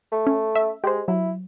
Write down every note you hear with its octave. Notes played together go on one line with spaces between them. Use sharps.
A3
C#4
E5
G#3 G4 C5
F#3 E4